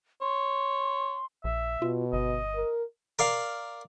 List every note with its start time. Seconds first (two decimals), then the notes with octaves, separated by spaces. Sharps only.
0.21 C#5 C6
1.44 A#1 E5
1.82 B2 F4
2.13 G1 D#5
2.55 A#4
3.19 A#4 D5 F5